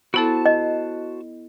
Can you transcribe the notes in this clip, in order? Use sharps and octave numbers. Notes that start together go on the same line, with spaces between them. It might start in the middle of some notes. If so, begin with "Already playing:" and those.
B3 E4 F#4 A4 C5 A5
D#5